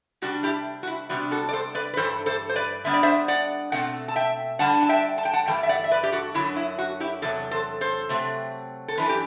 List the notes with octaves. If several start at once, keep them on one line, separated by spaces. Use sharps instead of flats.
C3 G3 D4 F#4
E4 G4
F#4
E4
C3 G3 B3 D4 F#4
F#4 A4
D5
A4 C5
B4 D5
B4
G2 E3 G3 A4 C5
A4 C5
C5
B4 D5
D3 G3 B3 D4 E5
D5
C5 E5
D5 F#5
B2 A3 C4 F#5
A5
E5 G5
D3 G3 D4 F#5 A5
A5
E5 G5
A5
G5
F#5 A5
G2 E3 A3 G5
E5
D5 F#5
E5
B4 D5
G4
F#4 A4
F#2 D3 F#3 E4
E4
F#4
E4 G4
E2 C3 F#3 A4
A4 C5
A4 C5
C3 F#3 A3 C4
A4
F#2 E3 D4 B4
G4